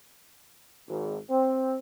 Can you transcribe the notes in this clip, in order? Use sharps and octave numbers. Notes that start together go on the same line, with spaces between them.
G#1
C4